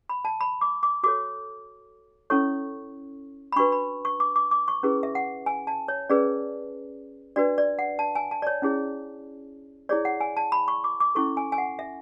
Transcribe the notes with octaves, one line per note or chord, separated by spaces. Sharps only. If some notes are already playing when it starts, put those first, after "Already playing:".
B5
A5
B5
D6
D6
F#4 A4 C#5 D6
C#4 E4 A4 C#5 C#6
B5
D4 F#4 B4 C#6
B5
C#6
D6
D6
D6
C#6
C#4 E4 G#4 B4
E5
F#5
G#5
A5
C#5
C#4 G#4 B4 D5
D4 F#4 B4 D5
D5
F#5
A5
G#5
A5
D5
C#5
C#4 E4 G#4 C#5
E4 G#4 C#5 D5
F#5
G#5
A5
B5
C#6
D6
D6
C#4 E4 A4 C#6
G#5
G#5
F#5
E5